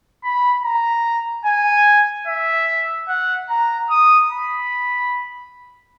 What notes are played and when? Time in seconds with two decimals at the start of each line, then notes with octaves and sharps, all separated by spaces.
0.24 B5
0.63 A#5
1.45 G#5
2.27 E5
3.08 F#5
3.50 A#5
3.90 D#6
4.31 B5